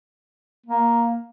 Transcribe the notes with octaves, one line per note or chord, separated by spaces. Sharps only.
A#3